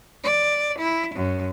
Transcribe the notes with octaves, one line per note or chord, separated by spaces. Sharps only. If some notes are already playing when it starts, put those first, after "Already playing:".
D5
E4
F#2